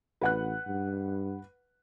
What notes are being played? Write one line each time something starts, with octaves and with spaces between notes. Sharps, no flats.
A1 B4 F#5 F#6
G2